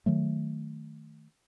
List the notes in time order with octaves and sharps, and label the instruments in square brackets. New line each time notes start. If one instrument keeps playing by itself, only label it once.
[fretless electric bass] D#3 F#3 A3